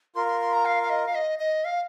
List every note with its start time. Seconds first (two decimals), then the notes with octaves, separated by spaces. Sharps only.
0.15 F4 A#4 C6
0.28 C6
0.41 C6
0.53 A#5
0.65 F5
0.83 F5
0.90 D#5
1.06 F5
1.15 D#5
1.39 D#5
1.65 F5